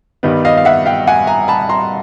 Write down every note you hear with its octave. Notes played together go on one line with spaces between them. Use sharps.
G2 D#3 G3 B3
D#5 F5
F5
E5 F#5
F5 G5
F#5 G#5
G#5 A#5
A5 B5
A#5 C6